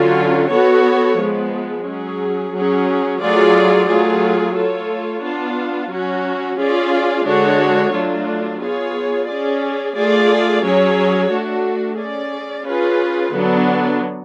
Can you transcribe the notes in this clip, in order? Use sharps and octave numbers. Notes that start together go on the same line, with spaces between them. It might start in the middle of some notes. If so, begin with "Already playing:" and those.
Already playing: D3 F#3 C#4 F4
B3 F#4 A4 C#5
F3 G#3 B3
F#3 C#4 G#4
F#3 C#4 G#4
F#3 A3 F4 G#4 D5
F#3 A3 F4 G#4
A3 F4 A4 C#5
B3 D4 F4
F#3 C#4 F#4
C#4 F4 G#4 D5
D3 G#3 D4 F#4 C#5
F#3 A3 D4 F4
B3 F4 G#4 C#5
C#4 G#4 D5
A3 F4 G#4 D5
F#3 C#4 G#4 C#5
A3 D4 F#4
C#4 G#4 D5
C#4 F4 G#4 B4
D3 F#3 B3 D4